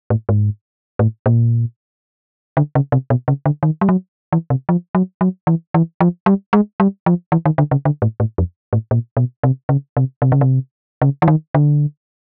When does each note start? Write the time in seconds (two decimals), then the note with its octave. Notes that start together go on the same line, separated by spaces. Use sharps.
0.10 A2
0.29 G#2
0.99 A2
1.26 A#2
2.57 D3
2.75 C#3
2.92 C3
3.10 B2
3.28 C#3
3.46 D3
3.63 D#3
3.81 G3
3.89 F#3
4.32 E3
4.50 C3
4.69 F3
4.95 F#3
5.21 F#3
5.47 E3
5.74 E3
6.00 F3
6.26 G3
6.53 G#3
6.80 G3
7.06 F3
7.32 E3
7.45 D#3
7.58 D3
7.71 C#3
7.85 D3
8.02 A2
8.20 A2
8.38 F2
8.73 A2
8.91 A#2
9.17 B2
9.43 C3
9.69 C#3
9.97 C3
10.22 C3
10.32 C#3
10.41 C3
11.02 C#3
11.22 E3
11.28 D#3
11.55 D3